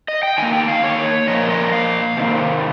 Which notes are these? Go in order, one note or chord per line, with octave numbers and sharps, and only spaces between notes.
D#5
G5
D#3 A#3 G#5
G5
F5
C#5
A#2 F3 A#3 D#5
D#5
F5
C3 D#3 A#3